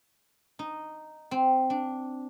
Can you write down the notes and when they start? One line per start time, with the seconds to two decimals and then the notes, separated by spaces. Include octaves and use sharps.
0.59 D#4
1.31 C4
1.70 D4